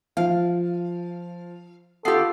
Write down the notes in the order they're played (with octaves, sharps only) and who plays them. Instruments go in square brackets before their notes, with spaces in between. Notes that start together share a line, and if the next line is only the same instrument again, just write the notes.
[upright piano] F3 [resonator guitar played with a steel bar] F5
[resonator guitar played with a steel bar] B3 G4 [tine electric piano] F4 C7 [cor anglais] A4